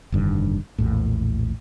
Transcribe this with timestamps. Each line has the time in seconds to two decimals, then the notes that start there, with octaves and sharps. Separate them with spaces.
0.12 F1 G2 D3 D#3
0.78 A#1 E2 A2